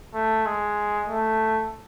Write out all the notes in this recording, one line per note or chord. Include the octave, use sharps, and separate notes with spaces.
A3
G#3
A3